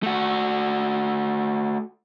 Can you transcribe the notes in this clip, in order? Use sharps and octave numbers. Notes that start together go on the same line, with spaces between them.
A3 F#4